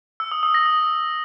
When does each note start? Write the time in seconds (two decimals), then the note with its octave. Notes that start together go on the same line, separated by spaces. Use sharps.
0.20 E6
0.31 D#6
0.43 D#6
0.54 A#6
0.66 D#6